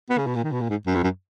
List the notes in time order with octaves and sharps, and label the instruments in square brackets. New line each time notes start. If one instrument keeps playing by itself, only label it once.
[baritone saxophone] B3
C#3
B2
A#2
D#3
B2
A#2
G#2
F#2
F2
F#2